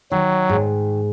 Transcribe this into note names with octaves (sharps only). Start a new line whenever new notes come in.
D#3 F#3
G#2